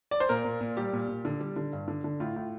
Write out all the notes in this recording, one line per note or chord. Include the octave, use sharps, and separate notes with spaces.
D5
C5
A#2 A#4
A#2
A#2
G3 G4
A#2
A#2
D3
G3
D3
G2
D3
D3
A2 F4
A2